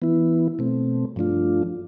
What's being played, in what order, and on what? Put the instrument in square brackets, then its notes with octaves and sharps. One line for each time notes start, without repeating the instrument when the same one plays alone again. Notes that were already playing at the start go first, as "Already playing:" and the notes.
[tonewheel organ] E3 B3 E4
B2 A3 C4
G2 F3 A3 D4 F4